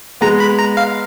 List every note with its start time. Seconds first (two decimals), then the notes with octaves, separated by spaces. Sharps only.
0.21 G#3 B3 A#5
0.40 B5
0.59 A#5
0.77 F5